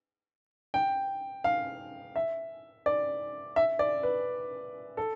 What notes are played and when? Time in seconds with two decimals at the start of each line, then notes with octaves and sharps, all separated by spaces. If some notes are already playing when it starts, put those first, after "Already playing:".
0.74 G5
1.44 F5
2.16 E5
2.86 D5
3.56 E5
3.79 D5
4.03 B4
4.97 A4